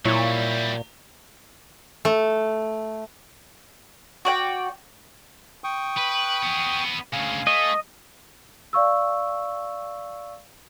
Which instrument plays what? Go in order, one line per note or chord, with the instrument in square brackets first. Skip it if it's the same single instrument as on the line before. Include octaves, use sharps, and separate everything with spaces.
[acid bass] A#2 [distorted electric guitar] F#3 G3 [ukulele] E4 C#5
[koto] A3
[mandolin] F#4 D5 G5
[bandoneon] G5 C#6 D#6
[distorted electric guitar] B4
B3 G#4
[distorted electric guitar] D2 C#3 [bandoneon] F5 G#5
[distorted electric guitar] A3 [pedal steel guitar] D#5
[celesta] D5 F5 C#6 E6